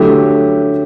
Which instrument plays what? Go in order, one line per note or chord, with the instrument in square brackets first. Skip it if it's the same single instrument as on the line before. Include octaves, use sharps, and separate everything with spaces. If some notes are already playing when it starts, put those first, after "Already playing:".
Already playing: [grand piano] D3 F#3 A3 E4 G4